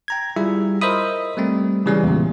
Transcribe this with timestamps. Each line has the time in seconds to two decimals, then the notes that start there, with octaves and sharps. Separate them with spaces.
0.08 G5 A#5 G#6
0.36 G3 E4 F4 G#4 E5
0.81 A#4 C5 D#5 E5 B5 D#6
1.37 G3 A3 C4
1.86 C#3 E3 G3 G#3 C#4 G#4
2.03 E2 A#2